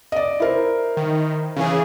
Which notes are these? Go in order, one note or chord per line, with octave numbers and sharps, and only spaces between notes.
D5 D#5
E4 A#4 C5
D#3
C#3 E3 G#4